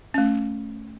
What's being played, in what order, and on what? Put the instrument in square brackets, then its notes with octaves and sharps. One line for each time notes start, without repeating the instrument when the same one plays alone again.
[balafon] A3 C#4